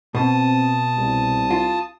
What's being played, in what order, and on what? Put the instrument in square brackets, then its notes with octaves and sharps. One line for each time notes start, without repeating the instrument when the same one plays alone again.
[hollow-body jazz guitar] B2 [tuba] C4 [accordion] A5 D#6
[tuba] C2
[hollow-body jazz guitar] F4